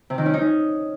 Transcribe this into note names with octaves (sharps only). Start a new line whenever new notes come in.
C3
D#3
C#4
D#4
C#4